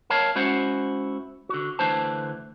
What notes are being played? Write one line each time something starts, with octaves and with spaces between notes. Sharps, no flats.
A#4 C#5 F5 A5
G#3 C#4 E4 F#4 C5 F#5
D3 F#4
D2 D3 E3 C5 A5